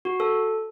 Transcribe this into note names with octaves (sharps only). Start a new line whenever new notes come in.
F#4
A4